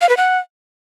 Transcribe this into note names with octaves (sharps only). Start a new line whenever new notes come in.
F5
B4
F#5